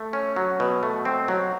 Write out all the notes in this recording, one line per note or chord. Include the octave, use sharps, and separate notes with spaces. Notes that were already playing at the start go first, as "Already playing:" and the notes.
Already playing: A3
C#4
F#3
B2
A3
C4
F#3